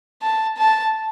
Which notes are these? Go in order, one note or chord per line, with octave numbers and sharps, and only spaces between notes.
A5
A5